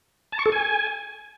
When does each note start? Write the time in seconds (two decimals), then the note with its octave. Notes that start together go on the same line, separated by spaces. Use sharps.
0.32 A5
0.39 C#6
0.46 A4
0.52 G#5